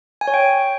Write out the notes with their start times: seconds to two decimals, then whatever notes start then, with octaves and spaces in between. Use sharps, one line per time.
0.21 G#5
0.27 C#5
0.34 G5